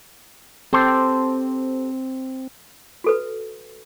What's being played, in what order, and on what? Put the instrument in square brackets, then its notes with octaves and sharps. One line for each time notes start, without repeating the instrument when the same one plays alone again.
[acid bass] C4 [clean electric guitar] G4 A4 C5
[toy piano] F#4 A4 B4